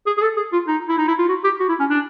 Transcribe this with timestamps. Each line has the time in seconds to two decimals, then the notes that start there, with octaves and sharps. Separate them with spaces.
0.06 G#4
0.18 G#4
0.22 A4
0.37 G#4
0.53 F4
0.67 D#4
0.89 E4
0.98 D#4
1.08 E4
1.19 F4
1.29 F#4
1.44 G4
1.60 F#4
1.69 E4
1.80 C#4
1.90 D4